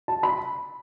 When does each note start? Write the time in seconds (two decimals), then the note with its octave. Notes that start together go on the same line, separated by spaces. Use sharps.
0.08 A5
0.23 B5